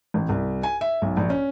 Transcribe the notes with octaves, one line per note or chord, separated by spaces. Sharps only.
A1
C2
G#5
E5
B1
A#1
C#4